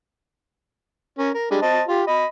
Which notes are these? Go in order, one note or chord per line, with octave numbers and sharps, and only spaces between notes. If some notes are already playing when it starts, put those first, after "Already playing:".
C#4 A#4
A#4
G3 G#3 D4
C5 D#5 A5
F4 G4
D#5 B5